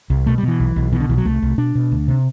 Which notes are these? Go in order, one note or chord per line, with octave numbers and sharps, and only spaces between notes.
C2
B2 A3
G3
B2 E3
B1
B1
B2 E3
D3
B1 E3
F#3
C2 A3
C2
B2 D4
B2
D2
C3